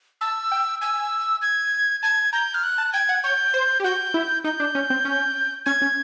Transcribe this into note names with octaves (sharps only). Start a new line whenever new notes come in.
A5 E6
G5
G#5 E6
G#6
A5 G#6
A#5 G6
F6
F#6
A5
G5 G#6
F#5
C#5 G6
C5
G4
F#4 G6
E4
D#4 G6
D4
C#4
C4
C#4
C#4 G#6
C#4